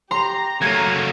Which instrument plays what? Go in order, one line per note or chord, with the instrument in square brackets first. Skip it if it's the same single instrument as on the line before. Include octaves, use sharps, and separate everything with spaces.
[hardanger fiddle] G4 [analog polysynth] A#5 [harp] C6
[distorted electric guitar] F#3 A#3 [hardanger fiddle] A3 [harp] G#6 D#7